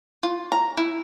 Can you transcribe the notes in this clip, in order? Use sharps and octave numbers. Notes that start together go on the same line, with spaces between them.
F4
A#5
E4